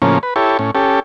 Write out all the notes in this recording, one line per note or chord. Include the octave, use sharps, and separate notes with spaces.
A2 C#3 F3 A#3 C#4
B4
E4 G4 A4 C#5
A2 C#4
C#4 G4 A4